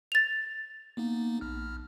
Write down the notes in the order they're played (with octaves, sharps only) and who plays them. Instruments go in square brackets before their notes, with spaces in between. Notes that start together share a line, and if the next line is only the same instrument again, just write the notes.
[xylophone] A6 F7
[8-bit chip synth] A#3 B3 D#4
A#1 F6